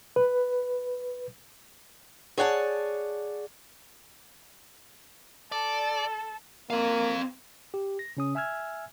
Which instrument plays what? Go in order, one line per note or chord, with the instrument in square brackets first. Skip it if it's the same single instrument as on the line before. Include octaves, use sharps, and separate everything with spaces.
[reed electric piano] B4
[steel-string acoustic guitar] G#4 C#5 D5 F#5 G5 A5
[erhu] A4 [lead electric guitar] D5
[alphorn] A#3 [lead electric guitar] C4 F5
[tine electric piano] G4
A#6
C#3 C#4 D#6
E5 G#5 E6 F6 G#6